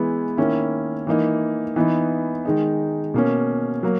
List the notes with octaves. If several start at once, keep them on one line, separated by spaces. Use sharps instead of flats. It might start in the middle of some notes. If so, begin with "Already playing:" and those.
Already playing: E3 G#3 B3 E4
D#3 A#3 C#4 E4
E3 A#3 D#4
E3 B3 D#4
D#3 G#3 D#4
B2 A#3 C#4
F#3 A#3